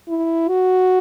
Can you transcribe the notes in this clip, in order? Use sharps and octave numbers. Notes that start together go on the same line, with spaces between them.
E4
F#4